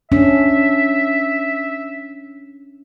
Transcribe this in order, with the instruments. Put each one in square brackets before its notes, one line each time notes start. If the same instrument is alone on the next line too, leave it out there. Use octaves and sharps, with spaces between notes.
[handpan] C#4 D4 [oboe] E5